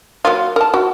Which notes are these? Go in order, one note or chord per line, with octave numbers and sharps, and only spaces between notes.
F#3 A#3 F4
A#4 A5
F#4